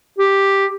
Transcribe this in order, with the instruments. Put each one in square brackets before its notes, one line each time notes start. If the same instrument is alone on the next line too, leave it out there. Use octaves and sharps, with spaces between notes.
[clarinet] G4